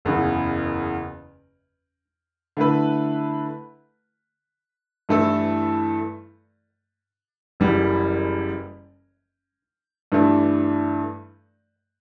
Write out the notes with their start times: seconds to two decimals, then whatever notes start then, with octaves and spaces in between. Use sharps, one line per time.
0.05 F#1 E2 C#3 E3
2.57 D3 A3 E4 B4
5.09 G2 E3 A3 E4 A4
7.60 F#1 F#2 E3 G3
10.12 G2 E3 A3 D4